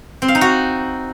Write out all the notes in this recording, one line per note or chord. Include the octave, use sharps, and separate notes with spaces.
C4
F5
D#4
F#4